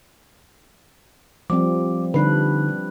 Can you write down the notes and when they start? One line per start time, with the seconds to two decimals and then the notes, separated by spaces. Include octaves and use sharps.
1.50 F3 G3 C4 D6
2.14 D3 G3 D4 D#4 B4